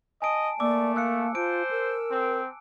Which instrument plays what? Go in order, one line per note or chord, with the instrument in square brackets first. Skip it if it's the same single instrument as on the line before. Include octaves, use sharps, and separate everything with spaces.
[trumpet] D#5 [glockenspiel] G#5 A5 D7
[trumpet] A3 [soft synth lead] A#3 [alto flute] D5 [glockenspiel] D6 E6
[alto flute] F5 [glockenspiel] E6 F#6 C#7
[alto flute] F4 [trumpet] C5 [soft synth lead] A5 [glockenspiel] D7
[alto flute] A#4 [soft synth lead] E6
[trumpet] C4